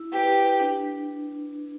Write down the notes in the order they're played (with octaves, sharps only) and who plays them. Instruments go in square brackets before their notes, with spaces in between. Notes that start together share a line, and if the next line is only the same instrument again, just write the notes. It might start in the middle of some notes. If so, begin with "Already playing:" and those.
Already playing: [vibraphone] E4
[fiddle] G4 [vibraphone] B4
[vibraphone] D4